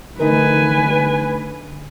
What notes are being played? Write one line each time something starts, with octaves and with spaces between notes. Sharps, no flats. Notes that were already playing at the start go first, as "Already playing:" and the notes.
D3 A3 D#4 A#4 B4 G#5